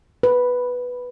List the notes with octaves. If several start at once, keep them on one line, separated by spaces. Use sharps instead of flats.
B4